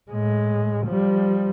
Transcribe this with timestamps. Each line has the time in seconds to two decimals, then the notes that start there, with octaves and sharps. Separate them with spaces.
0.11 A2 G#3
0.86 F3 G3